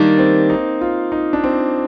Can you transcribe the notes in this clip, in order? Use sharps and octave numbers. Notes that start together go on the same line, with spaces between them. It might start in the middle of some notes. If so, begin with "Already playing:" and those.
Already playing: D#3 G3 A#3 D4
C4
D#4
F4
D#4
D4
C4